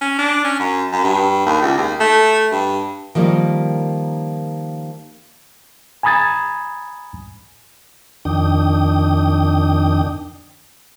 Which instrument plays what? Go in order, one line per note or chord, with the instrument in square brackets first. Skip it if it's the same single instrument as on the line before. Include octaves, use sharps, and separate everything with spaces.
[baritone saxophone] C#4
D4
C#4
F#2
F#2
G2
D#2
C#2
D#2
A3
G2
[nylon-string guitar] D#3 F3 G3 A#3
[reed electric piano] G#5 A#5 B5 D#6 G#6 A6
[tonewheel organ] F2 D#3 D4 G5 D#6